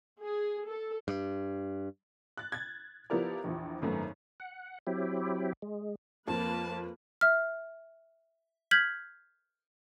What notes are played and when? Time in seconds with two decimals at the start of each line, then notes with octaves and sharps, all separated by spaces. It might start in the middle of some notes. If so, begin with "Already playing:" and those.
0.23 G#4
0.68 A4
1.08 G2
2.37 F#6 A6
2.52 G#6 A6
3.10 F3 B3 E4 G4 A#4 D5
3.44 A#1 E2 F3
3.82 G#1 F#2 A3 B3
4.40 F#5
4.87 F#3 C4 E4 G4
5.62 G#3
6.28 F2 F3 A#3 B4 A5
7.21 E5 F6
8.71 F6 G6 G#6 B6 F#7